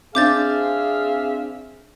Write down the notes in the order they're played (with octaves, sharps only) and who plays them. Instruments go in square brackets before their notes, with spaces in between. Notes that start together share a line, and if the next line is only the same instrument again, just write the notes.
[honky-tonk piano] C4 D4 [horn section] G#4 E5 F5 [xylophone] D6 G6 A6